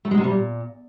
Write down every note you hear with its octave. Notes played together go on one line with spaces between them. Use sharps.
A3
G#3
C3
G3
A#2